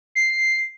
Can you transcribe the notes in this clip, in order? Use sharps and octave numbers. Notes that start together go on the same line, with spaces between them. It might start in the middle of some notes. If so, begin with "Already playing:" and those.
C7